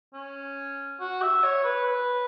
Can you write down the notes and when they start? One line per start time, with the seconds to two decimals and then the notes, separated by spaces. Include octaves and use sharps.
0.14 C#4
1.00 F#4
1.22 E5
1.43 C#5
1.64 B4
1.85 B4